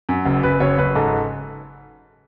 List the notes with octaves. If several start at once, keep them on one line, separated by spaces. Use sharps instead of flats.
F#2
F#1
F#1 B4
F#1 C#5
F#1 B4
G#2 A4